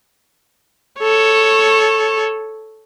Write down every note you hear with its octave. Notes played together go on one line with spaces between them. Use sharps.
A4 C#5